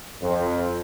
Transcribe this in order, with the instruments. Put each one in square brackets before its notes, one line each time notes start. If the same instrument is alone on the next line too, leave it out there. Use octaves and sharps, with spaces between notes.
[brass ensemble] F2